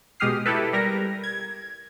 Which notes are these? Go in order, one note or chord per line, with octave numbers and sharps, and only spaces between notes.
B2 G#3 G4 D#6 F6 C7
E4 G4 A4 B4
G3 A#4 A#6
G#6